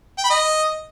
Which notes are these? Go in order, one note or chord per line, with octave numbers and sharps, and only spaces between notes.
G5
B5
D#5